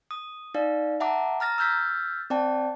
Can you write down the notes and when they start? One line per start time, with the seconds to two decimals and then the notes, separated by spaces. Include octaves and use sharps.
0.11 D#6
0.54 D#4 D5 F5
1.00 E5 F#5 A5 A#5 D6
1.40 A#5 F6 A6 A#6
1.58 E6 F6 G6 A6 B6
2.30 C4 D5 G5 A5